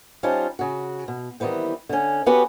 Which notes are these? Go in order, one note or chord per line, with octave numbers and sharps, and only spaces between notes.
G3 C#4 D#4 F4 C5 A5
C#3 F#4
B2
D#3 E3 G3 B3 C4
D3 C#4
B3 C#4 F#4 G4 B4